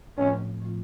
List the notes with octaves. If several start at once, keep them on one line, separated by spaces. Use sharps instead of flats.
A2 F3 A3 C4 C#4 F4
A2 F3 A3 C4 F4